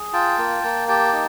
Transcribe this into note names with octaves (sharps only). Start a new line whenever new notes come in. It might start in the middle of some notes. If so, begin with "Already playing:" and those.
Already playing: G#4
F4 G5 A5
A#3
A#3
G4 G5 A5
D#4